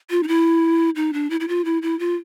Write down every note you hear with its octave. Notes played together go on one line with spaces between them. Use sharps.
F4
D#4
E4
D#4
D4
E4
E4
F4
E4
E4
F4